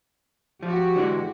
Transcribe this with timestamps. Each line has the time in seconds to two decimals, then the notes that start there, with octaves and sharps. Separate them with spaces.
0.63 F3 F#4 G4
0.96 D3 E3 G#3